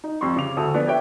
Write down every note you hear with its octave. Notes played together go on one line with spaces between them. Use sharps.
D#4
F2 G3 C6 C#6
C#3 D6 F7
D2 F#4 A4 D#6 E6
F3 B3 D4
G4 B4 C#5 E5 G5